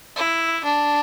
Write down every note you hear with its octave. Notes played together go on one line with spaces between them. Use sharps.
E4
D4